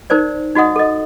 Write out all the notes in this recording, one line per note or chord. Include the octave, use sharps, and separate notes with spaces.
D#4 A#4 C5 D5
D#4 F#4 D#5 F#5 D#6
A4 D#5